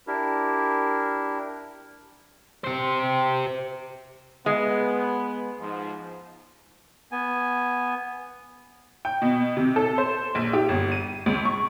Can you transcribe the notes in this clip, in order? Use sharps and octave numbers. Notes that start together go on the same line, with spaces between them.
D4 E4 G4 A#4
G4 C5
G#3 B3
G#2 F3
B3 G#5
G5
B2
C3
A4
C5
A#1
G4
G1
D#7
C#2
C#6